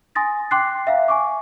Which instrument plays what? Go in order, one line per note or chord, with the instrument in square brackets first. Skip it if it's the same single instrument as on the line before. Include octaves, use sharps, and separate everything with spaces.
[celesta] G#5 C6 D#6 A6 A#6
G5 C6 D6 F#6 C7
E5 F5 A#5
G#5 C#6 D6